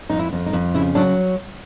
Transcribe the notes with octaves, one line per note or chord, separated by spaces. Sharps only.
F2 D#4
E4
F2
D#4
F2
C#3 E4
F#3 D4